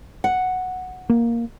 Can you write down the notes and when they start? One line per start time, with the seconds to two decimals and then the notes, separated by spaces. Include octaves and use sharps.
0.24 F#5
1.10 A#3